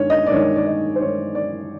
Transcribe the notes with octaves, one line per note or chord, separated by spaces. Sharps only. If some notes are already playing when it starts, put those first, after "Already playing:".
Already playing: G2 D#3 G#3 C#5
D#5
D5
G2 D#3 G#3 C#5
D5
D#5
C5
G2 D#3 G#3 C#5
D5